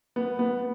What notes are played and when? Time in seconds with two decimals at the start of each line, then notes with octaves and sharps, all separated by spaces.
0.16 B3
0.39 B3